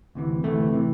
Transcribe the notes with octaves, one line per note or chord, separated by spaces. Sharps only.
D2 C3 E3
D2 C3 E3 A3
C3 E3